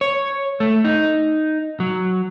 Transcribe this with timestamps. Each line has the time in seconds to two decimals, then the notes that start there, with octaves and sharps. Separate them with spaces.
0.01 C#5
0.60 A3
0.85 D#4
1.80 F#3